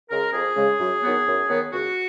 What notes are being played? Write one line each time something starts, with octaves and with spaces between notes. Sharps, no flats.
C#3 G#3 A#4
F2 G#4
C#3 G#3
F#2
D#3 F#3 B3
F#2
D#3 F#3 B3
C#2 F#4